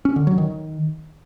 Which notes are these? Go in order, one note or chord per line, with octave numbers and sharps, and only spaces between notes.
C#4
D3
F#3
D#3